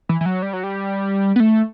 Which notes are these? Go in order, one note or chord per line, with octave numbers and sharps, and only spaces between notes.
E3
E3
F#3
G3
F#3
G3
B3
A3